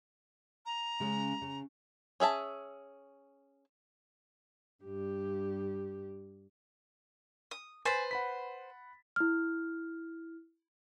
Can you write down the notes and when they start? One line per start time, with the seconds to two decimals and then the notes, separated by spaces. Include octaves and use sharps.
0.66 A#5
1.00 C#3 G#3 C#4
1.42 C#3
2.20 C#4 G#4 E5 A5
4.84 G2 G4
7.51 D#6
7.85 B4 C5 G#5 A6 B6
8.11 F#5 B5 B6
9.16 E4 F6